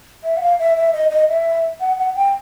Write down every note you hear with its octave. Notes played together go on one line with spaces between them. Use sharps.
E5
F#5
F5
E5
E5
D#5
D#5
E5
F#5
F#5
G5